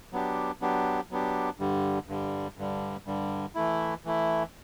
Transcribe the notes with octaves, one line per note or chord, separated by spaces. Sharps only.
F#3 B3 D4 G4
F#3 B3 D4 G4
F#3 B3 D4 G4
G2 D3 G3
G2 D3 G3
G2 D3 G3
G2 D3 G3
E3 A3 E4
E3 A3 E4